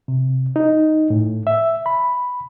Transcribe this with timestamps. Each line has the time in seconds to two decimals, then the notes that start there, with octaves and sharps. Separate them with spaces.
0.08 C3
0.56 D#4
1.10 A2
1.47 E5
1.86 B5